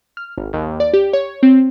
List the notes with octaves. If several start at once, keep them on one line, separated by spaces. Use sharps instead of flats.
F6
G#1
D#2
D5
G4
C#5
C4